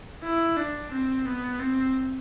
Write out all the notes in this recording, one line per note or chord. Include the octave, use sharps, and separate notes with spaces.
E4
D4
C4
B3
C4